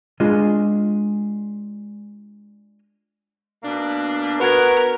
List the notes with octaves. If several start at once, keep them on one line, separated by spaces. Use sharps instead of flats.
G#3 D4 F4 G#4 D#5
B2 A#3 D4
B3 F#4 A#4 B4 G#6